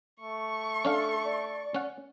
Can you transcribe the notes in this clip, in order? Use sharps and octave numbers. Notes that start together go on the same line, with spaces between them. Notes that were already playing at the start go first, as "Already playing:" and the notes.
A3 C#6
C#4 D4 A4 F5
D5
C#4 F#5